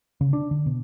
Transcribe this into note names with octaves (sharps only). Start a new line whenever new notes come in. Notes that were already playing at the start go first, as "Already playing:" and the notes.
C#3
D4
D3
B2